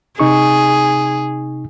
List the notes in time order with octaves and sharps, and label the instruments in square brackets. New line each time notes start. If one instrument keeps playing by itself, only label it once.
[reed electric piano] C3 D#4 C#6 [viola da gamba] G#4